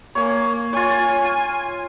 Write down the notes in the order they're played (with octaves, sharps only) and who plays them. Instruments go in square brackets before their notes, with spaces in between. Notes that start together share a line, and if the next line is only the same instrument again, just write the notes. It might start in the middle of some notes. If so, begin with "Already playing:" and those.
[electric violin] A#3 [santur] C#5 G#5
[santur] F4 C#5 [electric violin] G#5